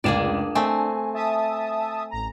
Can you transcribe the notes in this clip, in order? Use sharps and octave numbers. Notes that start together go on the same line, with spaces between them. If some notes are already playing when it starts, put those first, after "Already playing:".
F1 C#2 A#3 D4 G#4 D5 E7
A3 C4 G#5
E5 A5 D#6
A1 A#5